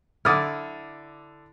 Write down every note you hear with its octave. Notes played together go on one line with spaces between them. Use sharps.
D3 E4 D5 D#6 F6